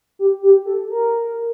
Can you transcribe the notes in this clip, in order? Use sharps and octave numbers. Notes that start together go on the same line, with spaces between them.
G4
G4
A4
A#4